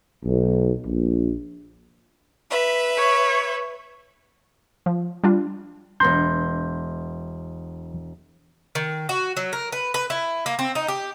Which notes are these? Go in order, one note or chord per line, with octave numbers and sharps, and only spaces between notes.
B1
A#1
B4 E5
C#5
F3
G3 D4 F4
E1 B3 A#5 C6 G6
D#3
F#4
F#3
A#4
B4
B4
E4
A#3
C4
D#4
G4